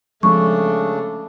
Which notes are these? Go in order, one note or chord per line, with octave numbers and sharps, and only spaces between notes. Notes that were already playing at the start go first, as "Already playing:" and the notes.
C#3 F3 G#3 A3 C4 D4 C#6